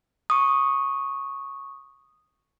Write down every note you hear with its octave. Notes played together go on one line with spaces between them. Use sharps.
C#6 D#6